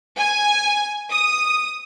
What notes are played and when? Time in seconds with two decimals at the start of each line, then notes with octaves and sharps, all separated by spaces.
0.18 G#5
1.12 D#6